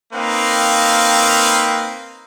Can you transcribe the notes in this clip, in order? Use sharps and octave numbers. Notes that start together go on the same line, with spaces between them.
A#3 C4 D#4 B4 F5